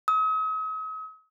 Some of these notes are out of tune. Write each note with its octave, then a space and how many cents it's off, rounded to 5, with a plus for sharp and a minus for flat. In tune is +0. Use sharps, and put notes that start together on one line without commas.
D#6 +45